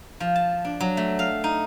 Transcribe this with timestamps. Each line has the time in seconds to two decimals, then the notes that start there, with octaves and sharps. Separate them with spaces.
0.20 F3
0.36 A5
0.65 D4
0.80 F#3
0.97 A3
1.19 F5
1.44 D#4